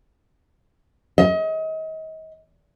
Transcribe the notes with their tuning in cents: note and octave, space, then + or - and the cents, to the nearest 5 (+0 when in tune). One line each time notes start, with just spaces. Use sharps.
D#5 +35